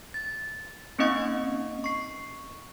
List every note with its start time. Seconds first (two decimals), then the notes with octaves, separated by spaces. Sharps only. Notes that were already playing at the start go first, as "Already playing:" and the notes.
0.14 A6
0.99 A#3 C4 C#4 D#4 D#5 C#6
1.84 C#6 C7